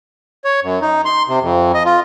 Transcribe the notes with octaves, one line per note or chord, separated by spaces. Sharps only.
C#5
F#2
D#4
C6
C3
F2
D#5
F4